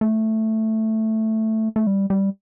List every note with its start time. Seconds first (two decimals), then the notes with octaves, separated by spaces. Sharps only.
0.01 A3
1.76 A3
1.87 G3
2.10 G3